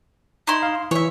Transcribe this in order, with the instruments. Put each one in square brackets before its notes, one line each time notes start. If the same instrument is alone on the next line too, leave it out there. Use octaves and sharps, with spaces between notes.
[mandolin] D#4 E4 C6
[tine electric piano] F5
[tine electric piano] E3 [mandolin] C#5 E5